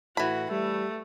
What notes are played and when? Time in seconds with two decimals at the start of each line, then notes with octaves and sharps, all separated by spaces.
0.17 A2 E3 F#4 B5
0.51 G3 A3